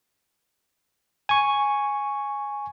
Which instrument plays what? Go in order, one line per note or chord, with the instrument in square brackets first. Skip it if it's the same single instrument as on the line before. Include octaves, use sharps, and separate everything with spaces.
[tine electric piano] G#5 C#6